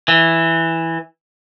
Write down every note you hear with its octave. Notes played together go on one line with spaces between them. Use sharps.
E3